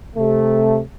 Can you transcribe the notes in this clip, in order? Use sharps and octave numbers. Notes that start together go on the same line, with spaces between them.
C3 A3